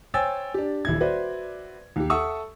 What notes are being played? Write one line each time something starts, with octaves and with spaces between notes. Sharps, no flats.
C5 C#5 G5 G#5 E6 A6
D4 G4
D#1 E4 G#6
F#4 B4 C5 D5 E5
D#2 G4
A4 E5 F#5 C#6 D#6 E6